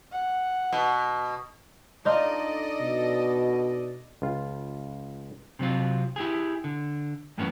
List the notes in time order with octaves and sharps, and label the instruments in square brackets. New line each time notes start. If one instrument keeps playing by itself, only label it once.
[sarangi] F#5
[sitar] B2
[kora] D4 D#4 F4 [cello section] A4 D5 D#5
[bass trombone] B2
[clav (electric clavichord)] C#2 F4
[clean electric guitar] C3 F#3 C4 F4
E4 G4 G#4
D3
F#2 A2 E3 A#3 B3 C#4